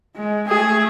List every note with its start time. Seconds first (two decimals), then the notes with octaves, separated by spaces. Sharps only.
0.16 G#3
0.48 A3 G#4